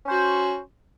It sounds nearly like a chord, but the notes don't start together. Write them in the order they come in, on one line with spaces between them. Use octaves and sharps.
C#4 C5 F#4